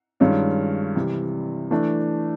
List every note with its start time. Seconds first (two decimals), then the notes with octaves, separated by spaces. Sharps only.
0.20 G2 D#3 G#3 C#4 F4
0.95 C3 E3 G3
1.71 E3 A3 D4